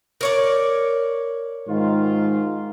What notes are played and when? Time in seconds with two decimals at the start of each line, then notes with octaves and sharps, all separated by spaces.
0.21 A#4 C#5 D5
1.68 G#2 D#3 F4